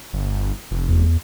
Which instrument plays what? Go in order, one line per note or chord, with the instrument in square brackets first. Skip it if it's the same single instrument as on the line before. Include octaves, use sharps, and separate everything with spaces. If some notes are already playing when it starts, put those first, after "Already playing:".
[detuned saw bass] G1
F1
[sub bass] E2